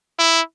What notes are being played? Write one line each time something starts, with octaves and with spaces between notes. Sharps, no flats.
E4